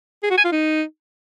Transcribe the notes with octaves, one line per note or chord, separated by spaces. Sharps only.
G#4
F#4
G#5
F4
D#4